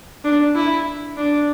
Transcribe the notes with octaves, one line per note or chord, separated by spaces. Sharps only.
D4
E4
D4